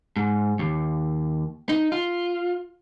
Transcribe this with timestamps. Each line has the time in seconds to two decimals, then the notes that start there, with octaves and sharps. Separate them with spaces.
0.16 G#2
0.59 D#2
1.69 D#4
1.92 F4